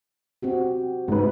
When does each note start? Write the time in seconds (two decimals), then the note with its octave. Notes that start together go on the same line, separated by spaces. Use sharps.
0.42 C4 F#4 G4
1.08 G#2 A3 D#4 B4